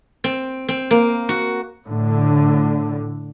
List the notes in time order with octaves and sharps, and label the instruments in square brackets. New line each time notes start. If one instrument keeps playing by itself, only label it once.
[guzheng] C4
C4
A#3
F#4
[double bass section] A2 D3